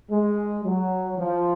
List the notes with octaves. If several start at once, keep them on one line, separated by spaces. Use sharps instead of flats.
G#3
F#3
F3